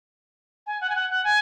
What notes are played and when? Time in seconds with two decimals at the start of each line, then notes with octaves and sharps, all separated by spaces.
0.67 G#5
0.81 F#5
0.89 G#5
0.96 F#5
1.10 F#5
1.24 G#5